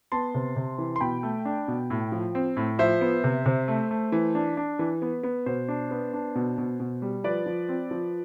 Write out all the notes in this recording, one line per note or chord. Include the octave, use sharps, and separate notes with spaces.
B3 A5 C6
C3
C3
E3
C6
B2 G5 B5
A3
D4
B2
A2
F3
C4
A2
F3 C5 E5
B3
C3
C3
A3
A3
E3
D4
D4
E3
B3
B3
B2 C5
D4
B3
D4
B2
B2
B2
G3
F3 B4 D5
F3
C4
F3